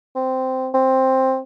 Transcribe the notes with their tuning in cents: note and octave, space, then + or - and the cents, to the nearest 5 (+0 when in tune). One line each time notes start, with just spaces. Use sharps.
C4 -10
C4 +10